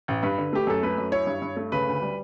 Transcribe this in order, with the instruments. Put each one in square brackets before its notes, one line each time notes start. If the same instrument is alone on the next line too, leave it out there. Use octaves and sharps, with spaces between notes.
[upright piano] A1
[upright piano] G2 [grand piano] B4
[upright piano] D3
[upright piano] A3 [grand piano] G4
[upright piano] F#2 [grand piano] A4
[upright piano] A3 [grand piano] B4
[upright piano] F#2
[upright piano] E4 [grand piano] C#5
[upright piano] G2
G2
A3
[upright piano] C#3 [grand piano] B4
[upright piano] D2
G3